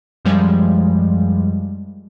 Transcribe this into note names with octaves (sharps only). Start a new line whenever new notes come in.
F#2 F3 G3 G#3